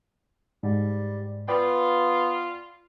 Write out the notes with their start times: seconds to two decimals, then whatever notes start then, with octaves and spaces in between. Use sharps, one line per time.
0.63 G#2 G3
1.48 B3 F4 B4 D5 G5